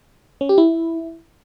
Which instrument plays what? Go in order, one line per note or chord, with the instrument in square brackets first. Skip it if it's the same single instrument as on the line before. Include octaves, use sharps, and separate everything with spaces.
[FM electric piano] C#4
G4
E4